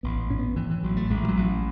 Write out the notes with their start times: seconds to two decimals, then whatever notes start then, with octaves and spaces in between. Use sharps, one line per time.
0.03 A1 B3
0.30 A2 C#4
0.39 B3
0.56 A2 E3
0.70 E3
0.83 A1 F#3
0.97 A3
1.10 A1 G#3
1.23 E3
1.28 F#3
1.37 A1